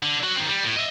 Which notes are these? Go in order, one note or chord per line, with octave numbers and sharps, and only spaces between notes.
D3
F#3
D#3 C4
G3
A2
D#5 E5